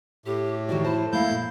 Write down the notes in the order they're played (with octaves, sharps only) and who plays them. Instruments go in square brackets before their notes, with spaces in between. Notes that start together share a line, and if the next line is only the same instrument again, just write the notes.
[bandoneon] A2 [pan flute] G4
[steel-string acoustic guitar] D#3 G4 D5 [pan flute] F#4
[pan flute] E4 [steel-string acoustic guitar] C5 A5
[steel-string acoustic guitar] A3 A#3 [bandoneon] E4 G6 [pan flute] F5
[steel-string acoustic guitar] A#2